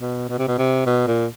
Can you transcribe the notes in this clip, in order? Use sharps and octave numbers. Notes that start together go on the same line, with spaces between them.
B2
B2
C3
B2
C3
B2
A#2